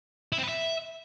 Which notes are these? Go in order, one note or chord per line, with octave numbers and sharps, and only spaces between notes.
E4
C4
B4
E5